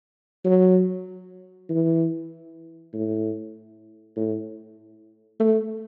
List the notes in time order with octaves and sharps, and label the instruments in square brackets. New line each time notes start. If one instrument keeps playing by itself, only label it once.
[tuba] F#3
E3
A2
A2
A3